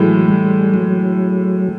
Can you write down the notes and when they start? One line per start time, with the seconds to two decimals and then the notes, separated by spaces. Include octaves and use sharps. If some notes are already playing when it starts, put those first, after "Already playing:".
Already playing: A2 E3 F#3 G#3
0.28 G3
0.74 F#3